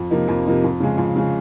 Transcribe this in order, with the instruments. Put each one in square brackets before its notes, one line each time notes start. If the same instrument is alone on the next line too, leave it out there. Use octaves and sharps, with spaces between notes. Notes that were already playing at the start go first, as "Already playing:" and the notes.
Already playing: [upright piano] F2
C3 F3 A#3 D#4
F2
C3 F3 A#3 D#4
F2
C#3 G#3
F2
C#3 G#3